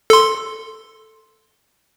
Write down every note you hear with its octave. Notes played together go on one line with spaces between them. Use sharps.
A4 C6